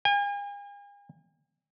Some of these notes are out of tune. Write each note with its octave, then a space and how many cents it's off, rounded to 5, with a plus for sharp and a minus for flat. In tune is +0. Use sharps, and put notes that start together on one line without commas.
G#5 -40